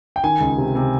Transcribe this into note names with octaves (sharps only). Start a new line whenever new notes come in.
G5
D#3 G#5
C#2
C3
C3